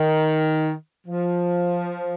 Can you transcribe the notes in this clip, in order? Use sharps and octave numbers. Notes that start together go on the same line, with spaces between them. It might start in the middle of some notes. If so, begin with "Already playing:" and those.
Already playing: D#3
F3